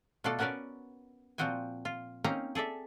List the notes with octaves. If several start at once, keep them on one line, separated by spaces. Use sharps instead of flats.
B2 A3 F4 F#4 A4 D5
B3 C#4 F#4 A#4 B4 D5
A#2 F3 C4 F#4 G5 G#5
F4
A#3 C4 C#4 D#4 A#5
G#4 A4 D5 E5